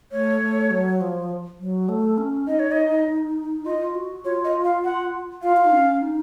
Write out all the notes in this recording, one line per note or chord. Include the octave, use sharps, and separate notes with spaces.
A3 C#5
A3
F#3
F3
F#3
A3
C#4
D#4 D#5
C#5
D#5
F4 D#5
F#4
F4 C#5
D#5
F5
F#5
F4 F5
F4
D#4
C#4
D#4